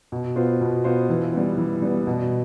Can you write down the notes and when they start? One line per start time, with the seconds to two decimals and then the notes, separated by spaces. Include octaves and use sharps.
0.12 B2
0.36 B3 F4 C5
0.61 B2
0.84 B3 F4 C5
1.10 E3
1.33 G3 B3
1.58 E3
1.82 G3 B3
2.07 B2